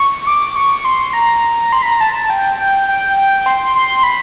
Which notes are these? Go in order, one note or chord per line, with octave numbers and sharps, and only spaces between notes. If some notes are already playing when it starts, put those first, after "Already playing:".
Already playing: C#6
D6
C#6
C6
A#5
C6
B5
A#5
A5
G5
G5
G5
G5
C6
C6
B5